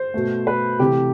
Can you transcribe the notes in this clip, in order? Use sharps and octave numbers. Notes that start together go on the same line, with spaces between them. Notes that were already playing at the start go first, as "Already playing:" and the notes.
Already playing: C5
B2 A3
B4
C3 E3 A3 G4